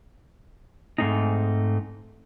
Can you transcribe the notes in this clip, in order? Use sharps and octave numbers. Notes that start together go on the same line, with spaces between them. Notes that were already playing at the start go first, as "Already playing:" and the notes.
G#2 G#3 A3 C4 D#4